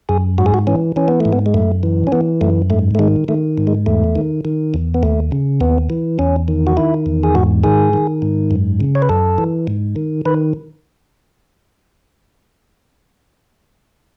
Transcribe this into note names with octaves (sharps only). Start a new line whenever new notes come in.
F#2 G#4
G#2 F#4
G#4
F#4
E3 C#4
E3 C#4
B3
G#2 A3
B3
G#3
F#2 A3
E3
C#4
E3 B3
F#2 A3
G#2 A3
A3
D#3 G#3
D#3 A3
G#2
G#3
E2 A3
D#3
D#3
E2
B3
D#2 A3
C#3
D#2 B3
E3
E2 C#4
D#3
F#4
D#3 E4
E2
G#4
G#2 F#4
D#3 G#4
D#3
G#2
F#2
C#3
C#5
B4
F#2 A4
E3
G#2
D#3
D#3 B4